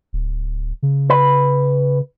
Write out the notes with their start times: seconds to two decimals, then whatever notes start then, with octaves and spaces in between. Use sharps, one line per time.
0.13 D1
0.83 C#3
1.10 B4